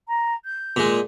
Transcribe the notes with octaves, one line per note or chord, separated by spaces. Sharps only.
A#5
G6
A#2 G#3